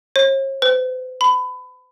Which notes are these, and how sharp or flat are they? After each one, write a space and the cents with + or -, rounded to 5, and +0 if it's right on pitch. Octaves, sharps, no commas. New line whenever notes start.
C#5 -45
C5 -45
B5 +25